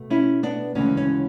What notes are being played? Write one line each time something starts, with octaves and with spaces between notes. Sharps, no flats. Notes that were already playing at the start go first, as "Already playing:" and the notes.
Already playing: B2 A3
C#4 E4
B3 D4
D2 C#3 E3 G#3 C#4
C#4